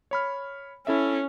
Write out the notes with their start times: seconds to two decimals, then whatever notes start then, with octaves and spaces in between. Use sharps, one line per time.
0.11 C#5 B5 F6
0.87 C#4 E4 A4 E5